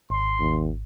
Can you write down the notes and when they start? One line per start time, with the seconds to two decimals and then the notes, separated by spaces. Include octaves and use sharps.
0.10 G#1 C6
0.40 D#2